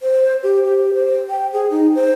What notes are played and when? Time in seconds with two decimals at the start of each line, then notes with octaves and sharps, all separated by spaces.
0.01 C5
0.43 G4
0.65 G4
0.94 C5
1.29 G5
1.53 G#4
1.71 D#4
1.95 C5